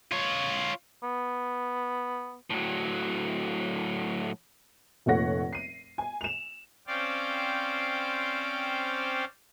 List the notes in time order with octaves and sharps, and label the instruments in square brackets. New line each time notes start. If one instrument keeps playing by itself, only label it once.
[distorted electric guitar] F4 C#5
[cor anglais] B3
[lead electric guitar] A2 F#3
[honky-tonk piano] F1 A#2 A3 C#5 F#5 A#6
C7 D#7
G#5
E7 F7
[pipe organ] C4 C#4 C5 D5 F5 G5